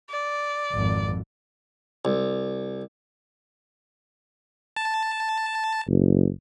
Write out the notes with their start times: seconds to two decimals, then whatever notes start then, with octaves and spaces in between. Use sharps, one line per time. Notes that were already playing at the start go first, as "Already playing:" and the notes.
0.10 D5
0.72 G#1 F2
2.05 C2
4.76 A5
5.87 F#1